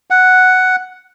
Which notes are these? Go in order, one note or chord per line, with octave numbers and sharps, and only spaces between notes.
F#5